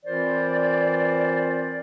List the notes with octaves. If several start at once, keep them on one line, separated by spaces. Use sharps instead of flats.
E3 C4 F4 A#4 C5 D5